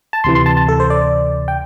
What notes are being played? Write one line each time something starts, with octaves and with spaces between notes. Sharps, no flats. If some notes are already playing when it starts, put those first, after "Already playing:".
A5
D2 C3 E3 C6
C6
A5
A5
A4
C5
D5
G5